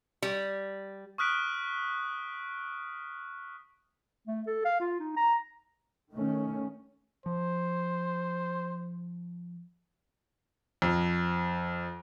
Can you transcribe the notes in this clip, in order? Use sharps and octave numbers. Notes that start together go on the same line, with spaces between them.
G3
C#6 D#6 F6 F#6 B6 D7
A3
A4
F5
F4
D#4
A#5
D#3 A3 C#4
F3 C5
F2